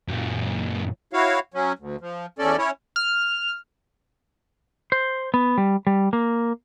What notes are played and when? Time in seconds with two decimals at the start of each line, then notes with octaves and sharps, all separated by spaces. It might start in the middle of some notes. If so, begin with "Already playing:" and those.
0.08 F#2 A#2
1.13 E4 F#4 C#5 F5
1.54 F#3 C#4
1.79 D2
2.01 F3
2.39 E2 C#4 A4 D5
2.58 C#4 E4 C#5
2.96 F6
4.92 C5
5.34 B3
5.58 G3
5.87 G3
6.13 A#3